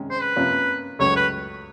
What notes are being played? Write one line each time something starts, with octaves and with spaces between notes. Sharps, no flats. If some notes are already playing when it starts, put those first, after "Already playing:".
Already playing: C3 D#3 G#3 C#4
C5
B4
C3 F3 A#3 C#4
C#2 C#3 F#3 A3 C#5
B4